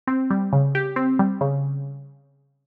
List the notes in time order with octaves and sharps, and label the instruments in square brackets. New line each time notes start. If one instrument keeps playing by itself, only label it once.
[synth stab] C4
G3
C#3
G4
C4
G3
C#3